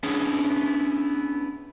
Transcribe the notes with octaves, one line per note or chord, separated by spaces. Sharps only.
B3 C#4 D4 E4 G#4 C#5